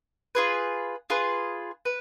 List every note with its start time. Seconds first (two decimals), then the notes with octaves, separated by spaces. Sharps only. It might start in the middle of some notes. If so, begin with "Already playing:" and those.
0.35 F4 G#4 B4
1.10 F4 G#4 B4
1.85 B4